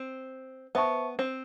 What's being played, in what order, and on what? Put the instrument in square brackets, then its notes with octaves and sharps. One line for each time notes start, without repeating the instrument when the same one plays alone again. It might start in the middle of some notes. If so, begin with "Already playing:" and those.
Already playing: [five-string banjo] C4
[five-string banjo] B3 [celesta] C5 E5 A5 C#6
[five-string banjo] C4